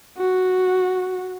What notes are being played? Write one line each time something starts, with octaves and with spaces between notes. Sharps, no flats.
F#4